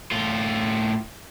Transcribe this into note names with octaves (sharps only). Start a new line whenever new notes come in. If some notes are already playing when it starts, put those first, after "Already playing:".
A2 F4